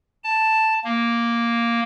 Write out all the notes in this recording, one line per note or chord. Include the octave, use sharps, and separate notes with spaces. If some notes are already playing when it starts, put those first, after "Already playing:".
A5
A#3